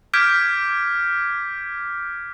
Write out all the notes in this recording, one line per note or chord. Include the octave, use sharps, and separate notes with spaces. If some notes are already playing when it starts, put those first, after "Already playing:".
D6 F6 G6 G#6 B6 D7